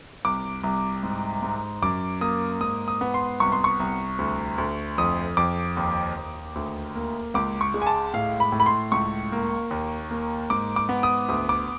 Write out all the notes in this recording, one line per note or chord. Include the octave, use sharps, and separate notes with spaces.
C2 D6
C2
G#2
G#2
F#2 D6
A#3 D#6
G#2 D#6
D#6
B3
C6
C2 C#6
C6
C#6
C2
D2
D2
F2 D#6
F2 D6
D#2
D#2
D2
A#3
C#2 D6
C#6
G#3
G#5
A5
A2 F5
B5
A2
B5
C6
C#2 C#6
A#3
D#2
A#3
G#2 D6
D6
B3
D#6
D2 D#6
D6